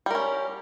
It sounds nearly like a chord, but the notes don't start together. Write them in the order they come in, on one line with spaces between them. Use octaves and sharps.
G3 A#4 C#4